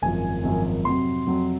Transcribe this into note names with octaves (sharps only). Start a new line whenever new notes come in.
G#1 F#2 F3 G#5
G#1 F#2 F3
F2 C3 F#3 C6
F2 C3 F#3